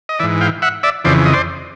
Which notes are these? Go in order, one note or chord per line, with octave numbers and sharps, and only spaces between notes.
D#5
G#2 E3 D5 E5
F5 G5
E5 F#5
D5 E5
F2 C#3 E3 C5 D5
D#5
C5 D5